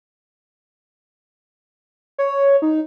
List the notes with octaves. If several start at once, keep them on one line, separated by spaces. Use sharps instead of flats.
C#5
D#4